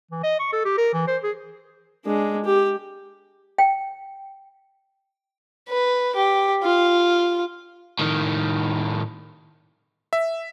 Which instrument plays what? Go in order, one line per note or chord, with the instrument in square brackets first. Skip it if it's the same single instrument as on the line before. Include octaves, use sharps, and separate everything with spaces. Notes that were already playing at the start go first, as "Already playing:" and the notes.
[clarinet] E3
D#5
C#6
A4
G4
A#4
E3
C5
G#4
[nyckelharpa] G#3 D4
G4
[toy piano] G5
[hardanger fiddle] B4
G4
F4
[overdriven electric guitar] A2 D#3
[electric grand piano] E5